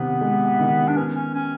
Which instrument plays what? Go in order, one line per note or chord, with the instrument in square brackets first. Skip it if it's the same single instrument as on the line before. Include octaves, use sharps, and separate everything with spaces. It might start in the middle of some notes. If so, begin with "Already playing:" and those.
Already playing: [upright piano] C3 D#3 [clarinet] B3
[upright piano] G#3
D#3
[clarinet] D4
[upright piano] B3 [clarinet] C#4
[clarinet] C#4
C#4